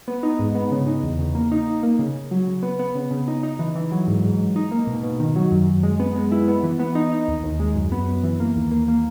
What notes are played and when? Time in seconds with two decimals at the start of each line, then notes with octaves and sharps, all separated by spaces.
0.08 B3
0.23 D#4
0.39 G#2
0.55 B3
0.71 C#3
0.87 D#4
1.03 E2
1.19 C#3
1.35 A#3
1.52 D#4
1.67 D#4
1.83 A#3
1.99 C#3
2.15 C#3
2.31 F#3
2.47 C#3
2.63 B3
2.79 B3
2.95 C#3
3.11 C#3
3.28 D#4
3.43 D#4
3.59 E3
3.75 E3
3.92 F#3
4.07 G#2
4.24 G#2
4.39 G#2
4.56 D#4
4.71 A#3
4.87 B2
5.03 B2
5.20 D#3
5.36 F#3
5.52 F#2
5.67 F#2
5.83 G#3
6.00 B3
6.16 G#3
6.32 E4
6.48 B3
6.63 E3
6.79 B3
6.95 D#4
7.12 D#4
7.28 D#2
7.43 D#2
7.60 G#3
7.75 F#2
7.92 B3
8.08 F#2
8.24 E3
8.40 A#3
8.56 D#2
8.71 A#3
8.88 A#3